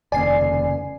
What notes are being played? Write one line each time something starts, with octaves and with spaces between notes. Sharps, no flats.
F1 D#2 C#3 D5 G#5 C7